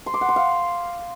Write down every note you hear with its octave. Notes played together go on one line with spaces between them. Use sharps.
C6
D6
F#5
C6
F5